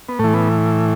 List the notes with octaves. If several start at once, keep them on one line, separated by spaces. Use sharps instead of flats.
B3
A2 E3 A3
B3